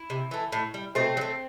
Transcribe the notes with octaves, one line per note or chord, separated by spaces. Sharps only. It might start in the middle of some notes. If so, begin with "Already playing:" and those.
Already playing: E4
C3
E3 A3
A2
G3
B2 A3 C4
F#3
A3